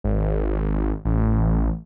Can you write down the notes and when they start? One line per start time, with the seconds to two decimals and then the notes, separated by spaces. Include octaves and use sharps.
0.04 G#1
1.05 A1